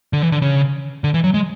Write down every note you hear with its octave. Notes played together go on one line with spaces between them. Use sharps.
D3
E3
D3
C#3
D3
E3
F#3
G#3